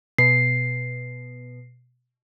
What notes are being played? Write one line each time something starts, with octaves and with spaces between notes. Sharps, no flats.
B2 C7